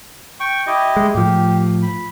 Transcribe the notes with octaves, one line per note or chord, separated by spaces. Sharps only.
G5 C#6
E4 G4 D#5
G#3
A2 F3 G4
B5